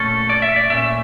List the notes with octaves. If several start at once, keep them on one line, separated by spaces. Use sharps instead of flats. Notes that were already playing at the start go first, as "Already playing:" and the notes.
Already playing: A#2 A3 C#4 A4
D5
E5
D5
A#2 A3 C#4 E5